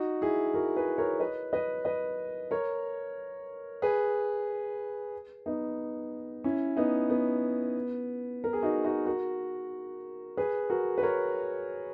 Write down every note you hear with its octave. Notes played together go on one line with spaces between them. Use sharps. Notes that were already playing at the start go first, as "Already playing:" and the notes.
Already playing: D#4 F#4
E4 G#4
F#4 A#4
G#4 B4
A#4 C#5
B4 D#5
B4 D#5
B4 D#5
A#4 C#5
G#4 B4
B3 D#4
C#4 E4
B3 D#4
B3
A#4
G#4
D#4 F#4
D#4 F#4
F#4 A#4
G#4 B4
F#4 A#4
B4
A#4 C#5